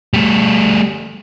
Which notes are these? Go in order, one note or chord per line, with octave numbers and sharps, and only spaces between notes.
G3 A3